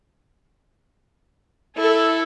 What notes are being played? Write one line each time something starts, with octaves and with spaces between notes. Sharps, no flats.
E4 A4